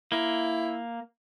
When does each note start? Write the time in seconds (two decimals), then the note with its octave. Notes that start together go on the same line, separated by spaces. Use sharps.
0.12 A#3 E4